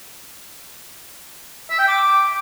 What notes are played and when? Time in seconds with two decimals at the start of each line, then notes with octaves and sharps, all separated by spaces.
1.70 E5
1.79 G5
1.88 D6